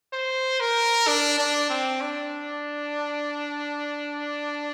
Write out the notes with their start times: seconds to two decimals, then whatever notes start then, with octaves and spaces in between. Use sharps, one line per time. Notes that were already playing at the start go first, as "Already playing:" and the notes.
0.13 C5
0.60 A#4
1.07 D4
1.38 D4
1.70 C4
2.01 D4